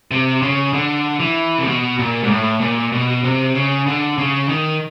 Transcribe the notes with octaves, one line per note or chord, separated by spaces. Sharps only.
C3
C#3
D3
E3
C3
B2
A#2
G#2
A2
A#2
B2
C3
C#3
D3
C#3
D#3